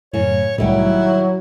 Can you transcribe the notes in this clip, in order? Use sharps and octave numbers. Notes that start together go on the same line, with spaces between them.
F#2 A2 C#3 C#5
C2 A2 D#3 F#3 G3 E4 G5